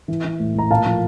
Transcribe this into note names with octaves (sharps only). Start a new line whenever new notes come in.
E3
E3
A2
A2 A#5
A#2 F5 A5
F3